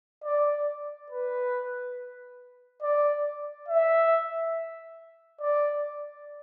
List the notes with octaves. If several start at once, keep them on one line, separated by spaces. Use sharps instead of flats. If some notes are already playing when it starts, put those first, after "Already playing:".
D5
B4
D5
E5
D5